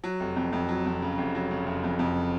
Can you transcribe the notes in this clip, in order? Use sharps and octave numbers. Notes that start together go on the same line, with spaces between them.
F#3
F1
F2
F2
F#3
F2
C#3
F1
F#3
C#3
F1
F2
F2